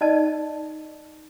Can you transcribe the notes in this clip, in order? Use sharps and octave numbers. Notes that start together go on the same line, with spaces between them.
D#4 D5 D#5 A5